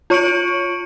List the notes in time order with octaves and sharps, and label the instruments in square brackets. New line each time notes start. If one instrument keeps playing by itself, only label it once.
[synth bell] F4 C#5 C#6 C#7 D7 F#7